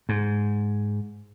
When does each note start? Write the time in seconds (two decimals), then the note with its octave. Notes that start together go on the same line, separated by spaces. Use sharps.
0.09 G#2